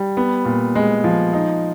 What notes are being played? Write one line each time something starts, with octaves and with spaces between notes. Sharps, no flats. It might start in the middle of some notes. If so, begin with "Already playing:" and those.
Already playing: G3
B3
A#2
G#3
F3
D#4